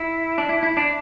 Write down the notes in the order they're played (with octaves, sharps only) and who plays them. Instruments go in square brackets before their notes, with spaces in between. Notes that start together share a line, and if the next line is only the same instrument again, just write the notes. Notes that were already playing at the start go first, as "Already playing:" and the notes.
Already playing: [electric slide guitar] E4
D4
E4
E4
D4